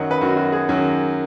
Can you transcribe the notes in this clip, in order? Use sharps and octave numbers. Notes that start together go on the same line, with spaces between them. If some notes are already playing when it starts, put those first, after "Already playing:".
Already playing: F#2 D#3 F#3 D#5 F#5
B4
F#2 D#3 F#3 F#4
F#4
G#4
F#2 D#3 F#3